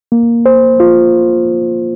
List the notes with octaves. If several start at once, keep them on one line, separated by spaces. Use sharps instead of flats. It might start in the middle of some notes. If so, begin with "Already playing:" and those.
A#3
C5
F4